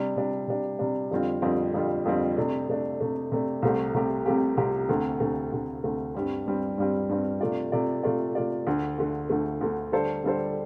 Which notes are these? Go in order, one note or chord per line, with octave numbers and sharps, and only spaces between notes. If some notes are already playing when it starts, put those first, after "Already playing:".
Already playing: C3 G3 D4
C3 G3 D4
C3 G3 D4
C3 G3 D4
F2 D3 G3 C4 F4
F2 D3 G3 C4 F4
F2 D3 G3 C4 F4
F2 D3 G3 C4 F4
C3 A3 D4
C3 A3 D4
C3 A3 D4
C3 A3 D4
C2 C3 A3 C4 G4
C2 C3 A3 C4 G4
C2 C3 A3 C4 G4
C2 C3 A3 C4 G4
D2 C3 A3
D2 C3 A3
D2 C3 A3
D2 C3 A3
G2 G3 C4
G2 G3 C4
G2 G3 C4
G2 G3 C4
C3 A3 F4 D5
C3 A3 F4 D5
C3 A3 F4 D5
C3 A3 F4 D5
D2 D3 A3
D2 D3 A3
D2 D3 A3
D2 D3 A3
D3 G3 D4 A4 C5
D3 G3 D4 A4 C5